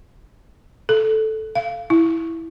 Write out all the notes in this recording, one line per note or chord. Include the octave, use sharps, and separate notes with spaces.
A4
F5
E4